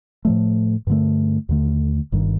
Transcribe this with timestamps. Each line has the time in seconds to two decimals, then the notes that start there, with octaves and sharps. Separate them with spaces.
0.25 A2 F3 A3
0.87 G2 D3 A3
1.49 D#2 D3 A3
2.12 G1 G2 D#3